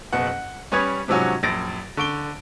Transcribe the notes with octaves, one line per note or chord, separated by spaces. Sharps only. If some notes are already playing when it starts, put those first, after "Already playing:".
F#1 B2 F#5
F#5
G3 C#4 B4 C#5 D#6 G#6
G#2 C3 F3 F#3 C#4 F#4
A#1 F#2 A6 A#6 D7
D3 C#6 D7 G7